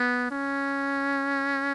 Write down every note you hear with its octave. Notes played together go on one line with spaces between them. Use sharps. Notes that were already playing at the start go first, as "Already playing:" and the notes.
Already playing: B3
C#4